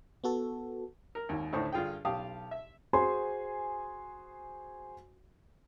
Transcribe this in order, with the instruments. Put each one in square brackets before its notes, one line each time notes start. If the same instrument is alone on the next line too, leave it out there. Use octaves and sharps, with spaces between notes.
[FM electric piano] B3 F#4 A4
[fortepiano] A#4
G#1 D#2
D2 A2 D#3 C5 C#6
G2 D3 F4 G#4 G5
B1 G4 F5 A5 D#6
E5
[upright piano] F#4 G#4 C5 G#5 C6